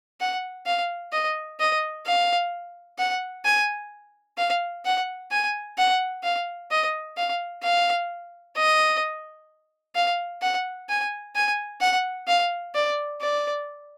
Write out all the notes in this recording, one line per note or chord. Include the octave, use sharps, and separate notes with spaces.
F#5
F5
D#5
D#5
F5
F#5
G#5
F5
F#5
G#5
F#5
F5
D#5
F5
F5
D#5
F5
F#5
G#5
G#5
F#5
F5
D5
D5